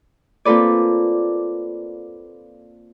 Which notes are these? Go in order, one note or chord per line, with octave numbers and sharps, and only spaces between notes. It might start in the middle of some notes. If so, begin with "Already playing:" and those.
A#3 C4 F4 A4 B4 D5